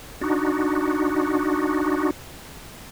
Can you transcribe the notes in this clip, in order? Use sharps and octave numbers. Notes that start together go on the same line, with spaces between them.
D4 D#4 F#4